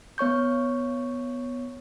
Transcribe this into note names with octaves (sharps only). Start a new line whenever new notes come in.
B3 C#5 C#6 G6